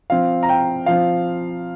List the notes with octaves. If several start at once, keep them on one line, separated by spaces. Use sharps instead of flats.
F3 C4 F5
A#5
G5
F3 C4 F5